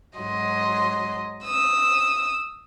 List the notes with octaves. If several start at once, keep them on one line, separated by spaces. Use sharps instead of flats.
G#2 F#3 D#5 C6
D#6 E6